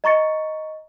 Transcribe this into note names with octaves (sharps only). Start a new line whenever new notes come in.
D#5 A#5 C#6 A6 C#7